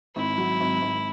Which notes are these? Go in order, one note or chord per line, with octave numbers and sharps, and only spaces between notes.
G#1 E4
F#3
G#1
G#1